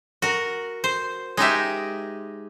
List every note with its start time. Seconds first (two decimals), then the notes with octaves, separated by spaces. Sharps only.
0.22 F#4 A#4
0.84 C5
1.37 G#3 D#4 G4 E5